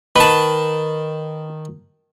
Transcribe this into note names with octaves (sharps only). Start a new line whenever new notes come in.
D#3 B4 A5